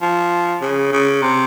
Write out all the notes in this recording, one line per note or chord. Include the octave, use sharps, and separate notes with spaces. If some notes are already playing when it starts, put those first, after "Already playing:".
F3
C#3
C#3
C3